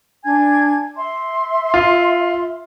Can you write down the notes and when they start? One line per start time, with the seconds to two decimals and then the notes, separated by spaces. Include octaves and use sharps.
0.24 D4 G#5 G#6
0.96 E5 C6
1.74 F4